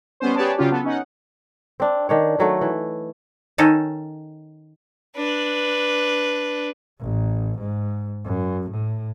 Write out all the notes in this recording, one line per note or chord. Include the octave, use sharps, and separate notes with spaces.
G3 B3 C#4 C5
G4 G#4 B4 C#5 D5 A5
C#3 F#3 C#4 F4 G4
B3 A4
C#4 D#4 F#5
C4 D4
D#3 D4 C#5
D#3 F#3 A3
E3
D#3 C#4 D#4 A4
D4 B4
A1
G#2
F#2
A2